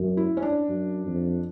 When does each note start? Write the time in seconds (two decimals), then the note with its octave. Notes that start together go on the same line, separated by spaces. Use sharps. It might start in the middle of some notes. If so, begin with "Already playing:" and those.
Already playing: F#2
0.17 E4
0.37 C#4
0.42 D4
0.68 F#2
1.06 F2